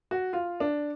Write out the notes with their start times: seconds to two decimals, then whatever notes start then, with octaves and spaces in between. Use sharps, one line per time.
0.11 F#4
0.33 F4
0.60 D4